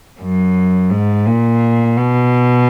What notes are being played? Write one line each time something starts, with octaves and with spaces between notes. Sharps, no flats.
F#2
G#2
A#2
B2